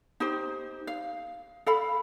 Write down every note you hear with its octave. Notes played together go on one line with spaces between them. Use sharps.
D#4 G4 C5
F5
A4 F5 B5